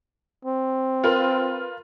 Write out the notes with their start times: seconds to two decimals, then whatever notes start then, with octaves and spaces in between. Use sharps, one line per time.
0.45 C4
1.04 F4 A#4 B4